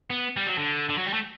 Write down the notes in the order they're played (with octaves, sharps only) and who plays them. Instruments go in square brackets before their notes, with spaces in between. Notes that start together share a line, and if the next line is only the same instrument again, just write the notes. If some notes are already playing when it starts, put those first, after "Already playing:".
[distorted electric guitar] B3
G3
F#3
D3
D3
F#3
G3
A3